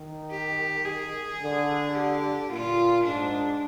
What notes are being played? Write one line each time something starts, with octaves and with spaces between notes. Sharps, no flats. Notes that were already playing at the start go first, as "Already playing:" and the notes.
Already playing: D#3
G4
G#4
D3
G4
A#2 F4
G#2 D4